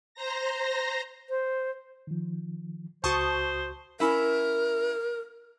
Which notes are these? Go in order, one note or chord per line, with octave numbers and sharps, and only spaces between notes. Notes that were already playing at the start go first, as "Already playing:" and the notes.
C5 A#5 A#6
C5
D#3 F3
C#2 F#4 C5 A5 C#6 D#6
C#4 E4 A#4 E5